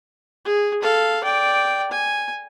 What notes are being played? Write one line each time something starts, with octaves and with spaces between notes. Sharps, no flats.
G#4
A4 F5
D5 G5
G#5